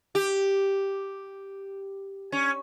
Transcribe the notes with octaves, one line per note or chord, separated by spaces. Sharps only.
G4
C#4